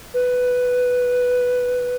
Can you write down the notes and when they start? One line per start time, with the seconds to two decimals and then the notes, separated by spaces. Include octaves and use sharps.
0.14 B4